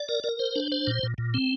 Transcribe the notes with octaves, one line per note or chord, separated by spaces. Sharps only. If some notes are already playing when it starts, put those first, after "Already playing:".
Already playing: D5
A#4
A#4
C5
D4
C5
A#2
A#2
A#2
C4